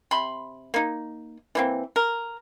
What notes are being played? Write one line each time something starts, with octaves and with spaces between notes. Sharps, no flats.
C3 B5 C6
A#3 D#4
E3 A#3 C4
A#4